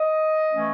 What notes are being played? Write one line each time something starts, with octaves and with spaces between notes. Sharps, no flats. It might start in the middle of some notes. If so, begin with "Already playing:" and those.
Already playing: D#5
E3 A3 C#4